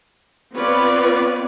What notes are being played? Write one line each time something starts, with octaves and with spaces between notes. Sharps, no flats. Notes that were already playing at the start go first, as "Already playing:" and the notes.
B3 C4 F4 B4 C#5 D5